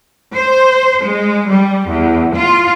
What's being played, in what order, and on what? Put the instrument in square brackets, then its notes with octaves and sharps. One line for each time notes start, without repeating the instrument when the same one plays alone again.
[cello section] C5
G#3
G3
E2
F4